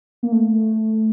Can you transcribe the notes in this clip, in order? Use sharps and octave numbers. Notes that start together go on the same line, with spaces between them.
A#3
A3